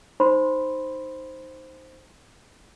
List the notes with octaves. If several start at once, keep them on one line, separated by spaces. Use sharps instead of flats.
D#4 C5 B5 C6